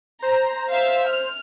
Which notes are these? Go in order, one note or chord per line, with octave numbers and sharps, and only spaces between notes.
C5 A#5
E5 F5
F6